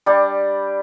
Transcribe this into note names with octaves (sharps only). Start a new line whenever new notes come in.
G3 D4 G4